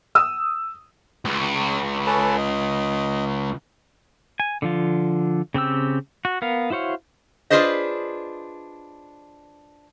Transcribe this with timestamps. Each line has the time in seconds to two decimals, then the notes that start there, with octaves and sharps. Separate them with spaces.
0.15 D#6 E6
1.25 C#2
2.06 C#4 A4 B4
2.37 D#5
4.40 G#5
4.62 D3 F3 F4
5.54 C#3 C4 G4 E6
6.25 F#4
6.42 B3 A#4 F5
6.70 E4 F#4 C5 C#5 F5
7.50 D4 F4 G#4 B4 C5 D#5